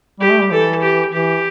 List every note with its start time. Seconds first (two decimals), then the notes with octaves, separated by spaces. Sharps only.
0.20 G3 G4
0.31 A3
0.41 G3
0.51 E3 A4
0.82 G4
1.13 E3 G4